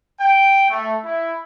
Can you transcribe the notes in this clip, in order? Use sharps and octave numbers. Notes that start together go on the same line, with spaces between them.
G5
A3
E4